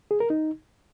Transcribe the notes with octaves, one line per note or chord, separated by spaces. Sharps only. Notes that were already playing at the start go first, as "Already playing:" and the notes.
G#4
A#4
D#4